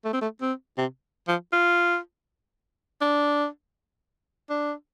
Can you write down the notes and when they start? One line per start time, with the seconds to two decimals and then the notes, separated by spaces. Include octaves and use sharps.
0.04 A3
0.13 C4
0.22 A3
0.41 C4
0.78 C3
1.28 F3
1.53 F4
3.01 D4
4.50 D4